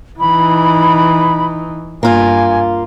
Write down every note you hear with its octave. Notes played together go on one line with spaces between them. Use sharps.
E3 D#4 B5
G2 A#3 F4 G#5